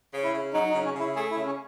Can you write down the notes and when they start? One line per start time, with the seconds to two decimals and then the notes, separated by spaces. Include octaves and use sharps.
0.13 C#3
0.23 E4
0.34 C#3
0.53 F#3 D#4
0.70 D#4
0.74 C#3
0.85 C#4
0.96 C#3 E4
1.15 A3 G#4
1.31 E4
1.36 C#3
1.46 C#4